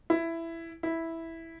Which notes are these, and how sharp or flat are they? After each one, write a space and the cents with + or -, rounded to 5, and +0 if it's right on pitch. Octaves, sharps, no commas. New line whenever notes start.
E4 +10
E4 -5